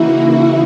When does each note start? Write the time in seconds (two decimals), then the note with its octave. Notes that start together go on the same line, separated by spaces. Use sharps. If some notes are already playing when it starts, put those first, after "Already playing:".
Already playing: C#3 E3 A#3 D#4 E4 F#4